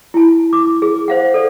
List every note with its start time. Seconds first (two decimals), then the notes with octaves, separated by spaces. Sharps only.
0.14 E4 A5
0.53 D6
0.82 G#4
1.08 C5 F5 F#5
1.34 A4 D5